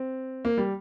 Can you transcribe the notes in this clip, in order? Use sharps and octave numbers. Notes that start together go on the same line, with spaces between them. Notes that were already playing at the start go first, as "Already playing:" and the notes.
Already playing: C4
A#3
G3